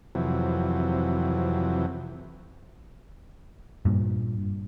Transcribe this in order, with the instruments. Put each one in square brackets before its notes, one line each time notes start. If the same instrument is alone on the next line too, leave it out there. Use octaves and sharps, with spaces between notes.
[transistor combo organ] F2 C3 E3 F#3
[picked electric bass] G2 A#2